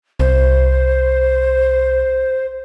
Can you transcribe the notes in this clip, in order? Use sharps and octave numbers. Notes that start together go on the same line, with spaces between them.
C2 C5